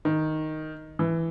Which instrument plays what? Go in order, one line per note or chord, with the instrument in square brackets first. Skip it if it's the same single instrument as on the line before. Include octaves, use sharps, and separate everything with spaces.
[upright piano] D#3
E3